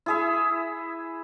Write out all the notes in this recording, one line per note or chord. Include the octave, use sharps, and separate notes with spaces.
E4 G#4 E5